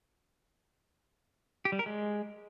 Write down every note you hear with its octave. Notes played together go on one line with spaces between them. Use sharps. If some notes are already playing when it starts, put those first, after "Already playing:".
G4
G3
A#4
G#3